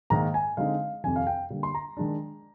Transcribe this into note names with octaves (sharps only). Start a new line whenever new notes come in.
G#2 D#3 A#3 A#5
G#5
D3 G#3 C4 D#4 F5
F2 C3 D#3 G#5
F5
G5
D3 G3 A#3
C6
A#5
D#3 G#3 D4